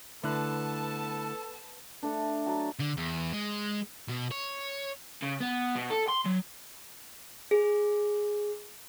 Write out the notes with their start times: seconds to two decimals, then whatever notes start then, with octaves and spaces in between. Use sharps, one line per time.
0.24 D3 A3 B3 E4 A4 B4 A5 F#6
2.03 A3 D4
2.46 F#3 A5
2.79 D3
2.97 E2
3.33 G#3
4.09 B2
4.32 C#5
5.22 C#3
5.40 B3
5.76 B2
5.91 A4
6.09 C6
6.26 F#3
7.51 G#4